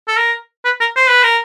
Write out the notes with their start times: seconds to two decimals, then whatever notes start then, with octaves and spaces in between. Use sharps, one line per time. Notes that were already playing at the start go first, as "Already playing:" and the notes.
0.07 A4
0.17 A#4
0.65 B4
0.80 A#4
0.96 C5
1.09 B4
1.23 A#4